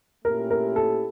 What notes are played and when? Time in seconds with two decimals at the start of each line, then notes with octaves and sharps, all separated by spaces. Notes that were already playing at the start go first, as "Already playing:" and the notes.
0.24 A#2 A3 C#4 E4 G4 A#4
0.50 A#4
0.76 A4